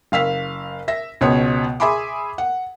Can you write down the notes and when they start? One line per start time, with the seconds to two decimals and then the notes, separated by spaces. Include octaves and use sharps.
0.12 F#1 F5 E6 B6
0.88 E5 A#6
1.21 C#2 B2 B3 C#5
1.80 G#4 E5 G#5 B5 C6 D6
2.38 F#5